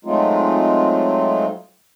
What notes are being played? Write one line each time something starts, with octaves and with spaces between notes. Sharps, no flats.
F#3 G#3 A3 C4 D#4 F4